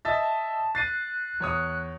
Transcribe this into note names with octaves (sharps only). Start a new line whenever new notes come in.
D#5 E5 A5 A6
F#6 A6 C7 D#7
E2 C#5 D#6